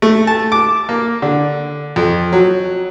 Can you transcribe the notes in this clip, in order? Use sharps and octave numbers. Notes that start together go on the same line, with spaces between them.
A3
A5
D6
A#3
D3
F2
F#3